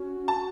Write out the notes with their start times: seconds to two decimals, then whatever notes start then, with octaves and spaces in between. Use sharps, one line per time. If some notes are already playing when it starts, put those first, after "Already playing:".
Already playing: C#4 F#4
0.28 A5